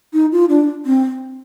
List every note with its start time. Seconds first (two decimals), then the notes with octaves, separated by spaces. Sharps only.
0.13 D#4
0.32 F4
0.49 D4
0.85 C4